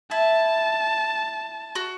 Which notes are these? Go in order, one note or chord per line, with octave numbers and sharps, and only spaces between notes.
E4 A5
F#4